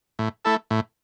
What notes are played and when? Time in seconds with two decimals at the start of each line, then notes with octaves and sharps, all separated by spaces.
0.19 A2
0.45 A3 E4 A4
0.71 A2